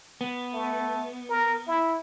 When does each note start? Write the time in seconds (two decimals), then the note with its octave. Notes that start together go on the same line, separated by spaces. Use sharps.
0.21 B3
0.53 A3
1.30 A#4
1.68 E4